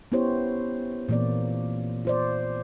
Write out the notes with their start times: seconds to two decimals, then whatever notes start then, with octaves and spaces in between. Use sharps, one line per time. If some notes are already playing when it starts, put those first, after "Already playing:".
0.12 B3 C#4 E4 G4 C5 C#5
1.09 A#2 E3 A#3 C4 D5
2.05 F4 C5 D5